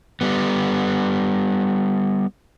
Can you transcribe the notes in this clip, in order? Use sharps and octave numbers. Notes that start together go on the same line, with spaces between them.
G3 B3